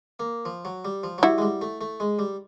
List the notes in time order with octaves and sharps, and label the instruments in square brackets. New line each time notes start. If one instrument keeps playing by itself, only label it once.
[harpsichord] A#3
F3
F#3
G3
F3
F#3
[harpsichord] G3 [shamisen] E4 F#4
[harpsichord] G#3
G3
A3
A3
G#3
G3